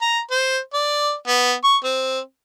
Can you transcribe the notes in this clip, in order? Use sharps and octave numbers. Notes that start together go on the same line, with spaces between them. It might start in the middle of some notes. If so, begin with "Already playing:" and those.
A#5
C5
D5
B3
C#6
C4